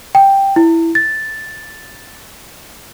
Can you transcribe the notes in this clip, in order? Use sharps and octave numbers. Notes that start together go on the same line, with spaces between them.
G5
E4
A6